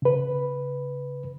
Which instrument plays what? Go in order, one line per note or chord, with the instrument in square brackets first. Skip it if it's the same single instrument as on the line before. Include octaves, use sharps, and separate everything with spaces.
[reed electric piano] C#3 B4